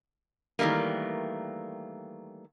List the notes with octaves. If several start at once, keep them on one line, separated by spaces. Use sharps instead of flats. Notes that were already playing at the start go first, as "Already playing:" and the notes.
D#3 E3 G3 A3 A#3